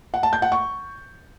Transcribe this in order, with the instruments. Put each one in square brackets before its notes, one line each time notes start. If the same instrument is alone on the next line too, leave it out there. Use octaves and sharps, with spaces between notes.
[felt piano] F#5
A5
G6
F#5
C#6